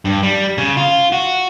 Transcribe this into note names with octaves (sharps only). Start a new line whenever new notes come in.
G2
G3
C#3
F4
F#4